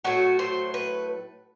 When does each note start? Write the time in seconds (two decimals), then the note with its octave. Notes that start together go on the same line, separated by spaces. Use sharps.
0.04 A2 F#3 A3 F#4
0.39 C5
0.74 B4